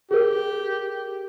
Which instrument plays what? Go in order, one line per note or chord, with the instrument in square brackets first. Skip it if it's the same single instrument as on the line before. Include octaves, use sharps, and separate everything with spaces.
[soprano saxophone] G4 [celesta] G#4 A#4